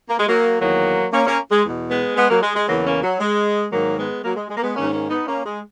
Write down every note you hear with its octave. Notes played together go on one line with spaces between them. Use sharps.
A#3
G#3
F#3 A#3
E2 D#3 F#3 A#3
A#3 C#4
A#3 C#4
G#3
E2 B2
G#3 B3
G#3 B3
F#3 A#3
G#3
G#3
E2 C#3 E3 F#3 A#3
A#3 C#4
F#3
G#3
G#2 D#3 F#3 A#3
G#3 B3
F#3 A#3
G#3
G#3
A#3
G#3 B3
G#2 D#3 A#3 C#4
A#3 C#4
B3 D#4
A#3 C#4
G#3